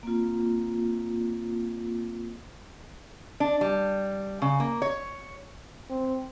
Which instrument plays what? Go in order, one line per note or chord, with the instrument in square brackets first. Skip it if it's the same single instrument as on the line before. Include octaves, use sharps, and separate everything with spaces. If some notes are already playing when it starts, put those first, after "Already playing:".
[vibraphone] A#3 C4 F4
[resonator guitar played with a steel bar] D4
G3
C#3
A#3
C#5
[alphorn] C4